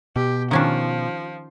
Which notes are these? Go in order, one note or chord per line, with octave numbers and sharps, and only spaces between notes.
B2 G4
D#3 F3 C#4 D4